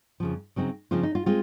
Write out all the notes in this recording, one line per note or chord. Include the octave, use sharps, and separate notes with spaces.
F2 C#3 F3
C#3 F#3 C4 D#4
C#3 F3 C4 D#4 F4
D#4
F4
G#3 C4 F4